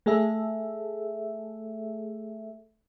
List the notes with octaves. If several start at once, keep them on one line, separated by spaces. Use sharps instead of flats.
A3 G#4 A4 E5